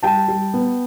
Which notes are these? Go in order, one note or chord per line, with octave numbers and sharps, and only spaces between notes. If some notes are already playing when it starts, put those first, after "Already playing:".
G3 G5 A5
G3
B3